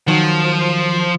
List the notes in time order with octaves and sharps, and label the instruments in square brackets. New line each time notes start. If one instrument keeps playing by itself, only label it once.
[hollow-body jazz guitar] D#3 F#3 [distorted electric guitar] F3